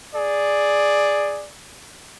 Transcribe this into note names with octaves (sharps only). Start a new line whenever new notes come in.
G#4 D5